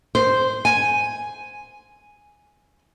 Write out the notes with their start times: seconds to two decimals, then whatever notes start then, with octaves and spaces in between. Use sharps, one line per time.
0.15 C5
0.65 G#5